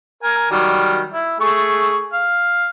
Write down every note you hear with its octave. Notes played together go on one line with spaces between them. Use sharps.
A#4 G#5
D#3 F#3 G3
E4
A3 G#4 C#6
F5